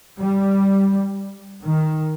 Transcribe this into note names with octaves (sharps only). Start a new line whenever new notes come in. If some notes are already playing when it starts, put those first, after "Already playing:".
G3
D#3